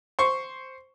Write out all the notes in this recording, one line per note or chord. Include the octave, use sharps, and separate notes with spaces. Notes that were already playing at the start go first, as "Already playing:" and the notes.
C5 C#6